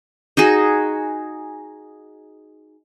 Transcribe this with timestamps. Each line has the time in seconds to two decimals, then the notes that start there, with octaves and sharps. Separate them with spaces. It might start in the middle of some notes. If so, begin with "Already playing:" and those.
0.37 D#4 F#4 G#4